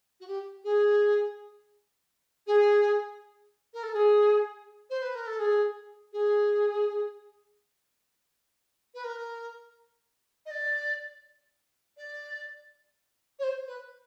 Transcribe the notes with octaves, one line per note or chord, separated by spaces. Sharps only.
F#4
G4
G#4
G#4
A#4
A4
G#4
C5
B4
A#4
A4
G#4
G#4
B4
A#4
D#5
D5
D5
C#5
C5
B4